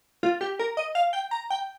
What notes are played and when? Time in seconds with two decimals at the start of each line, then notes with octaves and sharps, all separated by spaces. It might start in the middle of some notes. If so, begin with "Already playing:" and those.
0.23 F4
0.41 G4
0.59 A#4
0.77 D#5
0.95 F5
1.13 G5
1.31 A#5
1.50 G5